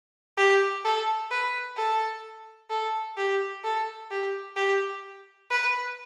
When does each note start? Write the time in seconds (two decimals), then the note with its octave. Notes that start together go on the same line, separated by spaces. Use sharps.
0.37 G4
0.84 A4
1.31 B4
1.77 A4
2.70 A4
3.17 G4
3.64 A4
4.11 G4
4.56 G4
5.50 B4